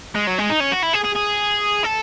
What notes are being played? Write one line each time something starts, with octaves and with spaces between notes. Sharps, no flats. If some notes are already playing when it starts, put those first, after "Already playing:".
G#3
F#3
G#3
D#4
C#4
F#4
E4
G#4
G#4
G#4
A4